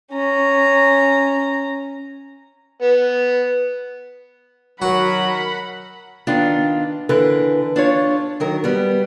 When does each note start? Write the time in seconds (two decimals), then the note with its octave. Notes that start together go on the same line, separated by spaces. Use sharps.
0.12 C#4 A#5
2.82 B3
4.82 D#3 F#3 F#4 A#4 F#5 B5
6.27 D#3 B3 D4 F4
7.09 D3 E3 A#4 B4
7.76 D4 F4 C#5
8.40 D#3 F#3 A#4
8.64 G3 B3